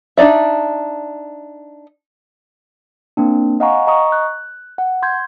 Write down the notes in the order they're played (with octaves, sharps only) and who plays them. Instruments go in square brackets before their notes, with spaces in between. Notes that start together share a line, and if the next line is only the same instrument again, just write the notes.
[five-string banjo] D4 D#4 D5 E5
[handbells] A#3 C4 D4
D#5 F5 F#5 G#5 A#5 C#6
D#5 A#5 C#6 D#6
F#6
F#5
C6 G6 G#6